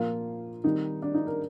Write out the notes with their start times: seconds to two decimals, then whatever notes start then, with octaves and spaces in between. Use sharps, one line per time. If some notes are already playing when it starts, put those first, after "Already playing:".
Already playing: A#2 F3 A#3 F4
0.64 D#3 G3 C4 D#4
1.02 D4
1.14 D#4
1.27 A#4